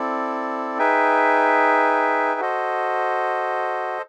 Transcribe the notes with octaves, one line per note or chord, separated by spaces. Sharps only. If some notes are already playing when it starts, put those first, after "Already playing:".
Already playing: C4 E4 A4 D5
D#4 G#4 B4 E5 G5
F#4 A4 C5 D#5